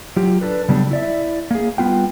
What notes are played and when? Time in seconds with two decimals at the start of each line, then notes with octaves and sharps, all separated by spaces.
0.16 F#3 F4 G4
0.41 D4 A4 B4
0.68 C#3 F#3 G3 B3 D4 G4
0.91 E4 D5 E5
1.51 A#3 G#4
1.78 G3 B3 F4 G5